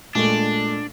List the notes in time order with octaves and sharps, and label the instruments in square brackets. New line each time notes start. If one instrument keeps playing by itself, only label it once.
[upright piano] A#2 G#3 A3 [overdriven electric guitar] D4